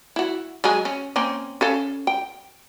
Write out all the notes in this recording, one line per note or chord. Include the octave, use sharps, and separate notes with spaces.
E4 F#4
F#3 G#3 G#4
C#4
A#3 C4 C#4
C#4 A4 F5
G5